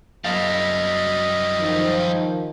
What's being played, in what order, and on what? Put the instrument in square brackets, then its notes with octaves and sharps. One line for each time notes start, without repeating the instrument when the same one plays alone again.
[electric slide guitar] F#2 F5 [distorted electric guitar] G3 E4 [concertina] D#5 F6
[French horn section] D#3 F3